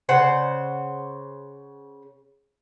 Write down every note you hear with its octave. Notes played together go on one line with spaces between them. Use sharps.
C#3 C5 F#5